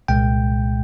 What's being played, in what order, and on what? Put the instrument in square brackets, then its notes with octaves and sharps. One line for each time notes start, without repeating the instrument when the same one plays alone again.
[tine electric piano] C2 A#2 G#3 G5